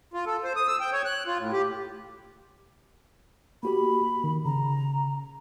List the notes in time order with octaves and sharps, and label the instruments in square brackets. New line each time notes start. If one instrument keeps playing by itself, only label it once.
[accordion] F4
A4
C5
D#6
E6
G5
C#5
F#6
F4
A2
G4
[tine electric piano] A#3 F#4 G4 [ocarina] B5
[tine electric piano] D#3
[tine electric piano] C#3 [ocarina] A#5